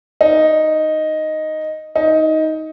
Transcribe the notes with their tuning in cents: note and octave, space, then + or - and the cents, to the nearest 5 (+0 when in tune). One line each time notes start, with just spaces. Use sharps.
D#4 +0
D#4 +15